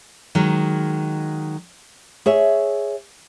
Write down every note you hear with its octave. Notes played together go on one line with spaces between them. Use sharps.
D#3 F#3 G#3
G#4 C#5 E5